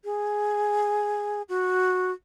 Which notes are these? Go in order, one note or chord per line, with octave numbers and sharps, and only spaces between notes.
G#4
F#4